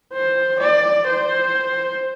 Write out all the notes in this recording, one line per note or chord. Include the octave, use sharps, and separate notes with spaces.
C5
D5
C5